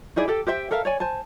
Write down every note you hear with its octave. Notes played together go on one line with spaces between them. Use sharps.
D#4 E4 G#4 D5
G4 A4 G5
G4 C5 E5 G5
A4 A#4 E5 F5
C#5 D5 G#5
C5 G#5 A5